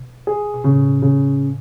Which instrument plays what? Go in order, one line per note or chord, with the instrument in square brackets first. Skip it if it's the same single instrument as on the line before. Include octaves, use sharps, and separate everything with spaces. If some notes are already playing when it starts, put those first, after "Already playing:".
Already playing: [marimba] B2
[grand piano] G#4
[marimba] B2
[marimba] A2 [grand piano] C#3
[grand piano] C#3